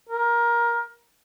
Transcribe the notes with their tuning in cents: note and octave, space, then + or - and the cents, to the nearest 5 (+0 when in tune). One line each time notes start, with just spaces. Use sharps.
A#4 +20